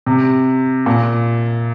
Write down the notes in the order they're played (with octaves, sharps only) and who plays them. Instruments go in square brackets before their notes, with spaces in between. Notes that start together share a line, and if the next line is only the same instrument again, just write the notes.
[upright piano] C3
A#2